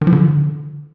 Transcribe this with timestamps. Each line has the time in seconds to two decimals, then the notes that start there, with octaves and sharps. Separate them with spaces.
0.01 D#3
0.07 F3
0.13 D3